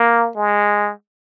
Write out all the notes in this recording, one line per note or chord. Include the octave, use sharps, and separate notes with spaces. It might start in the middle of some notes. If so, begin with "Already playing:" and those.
Already playing: A#3
G#3